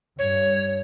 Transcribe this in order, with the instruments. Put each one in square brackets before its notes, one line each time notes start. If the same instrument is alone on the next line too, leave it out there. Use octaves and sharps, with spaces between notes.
[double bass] G2 [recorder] C#5